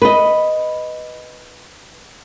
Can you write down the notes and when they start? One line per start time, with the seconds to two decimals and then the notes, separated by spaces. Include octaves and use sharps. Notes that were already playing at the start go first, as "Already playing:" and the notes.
0.02 B4 D#5